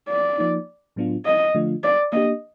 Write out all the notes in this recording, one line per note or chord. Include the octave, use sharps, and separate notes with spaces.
D5
F3 A#3 D#4
A2 F#3 B3 D4 F4
D#5
D3 F3 A3 D4 F4
D5
A#3 D4 G4 D#5